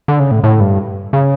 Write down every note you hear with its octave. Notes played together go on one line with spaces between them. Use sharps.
D3
C#3
A2
A2
G2
C#3